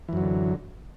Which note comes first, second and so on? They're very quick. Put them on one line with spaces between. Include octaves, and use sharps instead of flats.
E3 F#2 F#3 D3